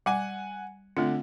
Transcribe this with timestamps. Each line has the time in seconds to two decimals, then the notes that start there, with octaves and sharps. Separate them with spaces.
0.06 G3 F#5 G#5
0.97 D3 A3 C4 F4